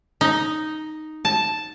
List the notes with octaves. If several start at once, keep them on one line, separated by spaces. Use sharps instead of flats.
D#4
A5